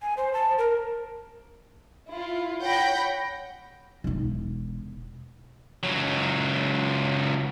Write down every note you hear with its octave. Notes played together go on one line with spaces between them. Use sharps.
G#5
C5
A5
A#4
E4 F4
C#5 F#5 G5 B5 G6 A#6
E1 D#4
C#2 F#3